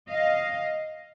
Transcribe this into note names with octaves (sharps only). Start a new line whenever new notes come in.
D#5 F5